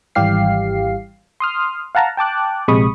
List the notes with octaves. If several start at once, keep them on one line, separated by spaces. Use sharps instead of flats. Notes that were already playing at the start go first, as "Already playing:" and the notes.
G#1 E3 G3 G4 F5 C7
C6 D#6 F6
F5 F#5 A5 A#5
G5 A5 D6 F#6
A#1 C3 G#3 B5 C#6 D#6